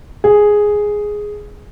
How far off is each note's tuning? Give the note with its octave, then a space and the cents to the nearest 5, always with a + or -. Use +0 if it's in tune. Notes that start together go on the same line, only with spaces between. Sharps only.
G#4 +0